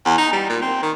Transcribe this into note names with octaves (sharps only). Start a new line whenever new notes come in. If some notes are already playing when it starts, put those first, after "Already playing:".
E2
D#4
G3
A#2
C4
D#3